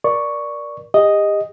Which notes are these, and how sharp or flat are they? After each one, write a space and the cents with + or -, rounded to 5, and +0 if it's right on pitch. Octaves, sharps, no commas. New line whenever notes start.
A#4 +25 D5 +0 C#6 +0
G4 +40 D#5 +0